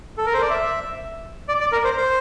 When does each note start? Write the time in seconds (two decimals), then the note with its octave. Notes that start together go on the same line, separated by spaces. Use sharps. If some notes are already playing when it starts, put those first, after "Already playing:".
0.18 A4
0.26 A#4
0.34 C5
0.42 D5
0.50 E5
1.48 D5
1.61 D5
1.72 A#4
1.84 C5
1.97 C5